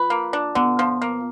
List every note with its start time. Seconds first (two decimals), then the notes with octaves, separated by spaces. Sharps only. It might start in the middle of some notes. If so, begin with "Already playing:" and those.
Already playing: F4 B4
0.10 A#3
0.33 D4
0.55 D3 B3
0.79 F3
1.02 A#3